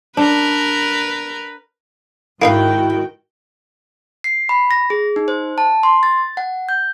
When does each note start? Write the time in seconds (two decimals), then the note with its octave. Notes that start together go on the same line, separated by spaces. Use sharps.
0.17 D4 A#4 B4
2.42 G#2 D#3 A#3 D#4 E4 F#4 F5 G5
4.24 C7
4.49 B5
4.71 A#6
4.90 G#4
5.16 D#4
5.28 C5
5.58 A5
5.83 C6
6.03 A6
6.37 F#5
6.69 G6